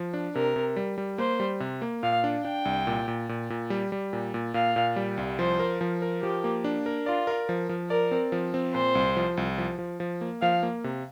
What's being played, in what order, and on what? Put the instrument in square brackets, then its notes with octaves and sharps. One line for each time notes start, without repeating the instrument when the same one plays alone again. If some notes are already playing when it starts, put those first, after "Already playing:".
Already playing: [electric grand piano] F3
D4
[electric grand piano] C3 [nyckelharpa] A#4
[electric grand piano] C3
G3
G3
[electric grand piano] A#3 [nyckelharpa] C5
[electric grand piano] G3
C3
A#3
[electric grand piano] A#2 [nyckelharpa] F5
[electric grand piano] D4
[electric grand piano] D4 [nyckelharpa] G5
[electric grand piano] C2
A#2
A#2
A#2
A#2
G3
G3
A#2
A#2
[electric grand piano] A#2 [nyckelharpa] F5
[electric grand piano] A#2
G3
C2
[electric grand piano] F3 [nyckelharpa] C5
[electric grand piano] A#4
F3
A#4
[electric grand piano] F3 [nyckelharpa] G4
[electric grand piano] A#3
D4
A#4
[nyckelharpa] F4 [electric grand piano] D5
[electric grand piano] A#4
F3
F3
[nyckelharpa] A#4 [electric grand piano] D5
[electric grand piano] C4
F3
C4
[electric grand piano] A#2 [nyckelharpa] C5
[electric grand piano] C2
F3
C2
F3
F3
F3
A#3
[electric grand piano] F3 [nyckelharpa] F5
[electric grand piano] A#3
C3